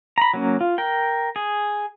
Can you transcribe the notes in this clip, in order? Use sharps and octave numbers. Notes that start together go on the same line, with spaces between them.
A#5 B5
F#3 A#3 C#4
F4
A#4 G5
G#4